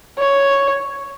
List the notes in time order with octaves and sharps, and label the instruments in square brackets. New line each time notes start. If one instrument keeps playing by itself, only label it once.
[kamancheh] C#5